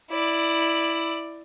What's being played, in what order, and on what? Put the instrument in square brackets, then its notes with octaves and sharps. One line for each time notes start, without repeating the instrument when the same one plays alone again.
[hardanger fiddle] E4 D5